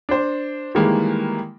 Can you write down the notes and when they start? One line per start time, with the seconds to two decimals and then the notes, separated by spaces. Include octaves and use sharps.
0.09 D4 C5
0.75 D#3 E3 G3 G#3 A#3